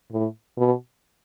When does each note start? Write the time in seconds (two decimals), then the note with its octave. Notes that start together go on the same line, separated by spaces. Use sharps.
0.12 A2
0.58 B2